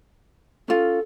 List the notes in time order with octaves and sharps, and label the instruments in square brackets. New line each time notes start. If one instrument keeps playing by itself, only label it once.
[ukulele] C#4 F4 [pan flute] A4